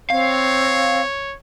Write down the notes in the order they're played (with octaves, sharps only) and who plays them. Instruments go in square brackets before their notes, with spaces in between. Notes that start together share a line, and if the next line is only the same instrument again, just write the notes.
[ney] C4 [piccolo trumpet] C#5 [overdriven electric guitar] F5